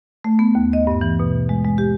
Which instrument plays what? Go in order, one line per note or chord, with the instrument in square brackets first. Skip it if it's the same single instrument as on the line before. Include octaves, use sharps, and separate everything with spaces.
[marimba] A3
B3
D#2
D#5
G2
E3
B2
G#3
G#3
G4